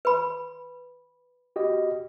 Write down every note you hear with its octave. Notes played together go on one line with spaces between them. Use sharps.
B4 B5
F#4 G4 D#5